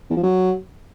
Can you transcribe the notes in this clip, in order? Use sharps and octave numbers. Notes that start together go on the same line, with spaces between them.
E2
F3
F#3